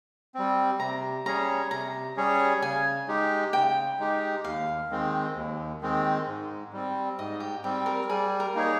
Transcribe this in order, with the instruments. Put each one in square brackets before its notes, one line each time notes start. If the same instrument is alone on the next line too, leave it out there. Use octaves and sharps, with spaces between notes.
[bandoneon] G3 C4
[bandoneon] C3 [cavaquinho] A#5
[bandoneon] G3 C#4 G#4 C#5 [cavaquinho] A#5
[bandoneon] C3 [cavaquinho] A#5
[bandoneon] G3 C#4 G#4 C#5
[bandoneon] C#3 [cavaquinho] G#5
[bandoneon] G#3 D#4 G4
[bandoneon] C#3 [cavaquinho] G5
[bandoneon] G#3 D#4 G4
[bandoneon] D#2 [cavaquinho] F5
[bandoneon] D#3 G#3 C4
D#2
D#3 G#3 C4
G#2
G3 C4
[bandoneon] G#2 [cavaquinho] D#5
[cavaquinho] G4
[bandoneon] G3 C4 [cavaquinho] G4
[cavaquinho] A#4
[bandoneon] G3 [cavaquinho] G#4
[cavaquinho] A#4
[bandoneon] A#3 D#4 G#4 C#5